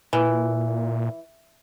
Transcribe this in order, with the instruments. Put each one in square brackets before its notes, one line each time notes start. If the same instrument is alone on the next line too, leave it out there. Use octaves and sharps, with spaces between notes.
[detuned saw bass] A#2 [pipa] E3